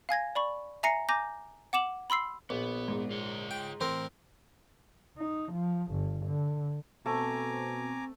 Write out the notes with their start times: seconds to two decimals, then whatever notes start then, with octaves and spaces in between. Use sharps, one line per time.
0.09 F5 G#5 G#6 A#6
0.35 D5 B5 C#6
0.83 E5 G#5 A#5 A#6 C7 C#7
1.09 G#5 A#5 D6 G6 A#6
1.73 F#5 D6 E7 F#7
2.10 B5 C6 E6 C7
2.50 A#1 B3
2.88 G#2
3.11 F4 C#5
3.51 G5
3.81 A2 E3 C4 A#4 C6
5.18 D#4
5.52 F3
5.91 G1
6.26 D3
7.06 B2 A3 C4 G#5 A#5 D6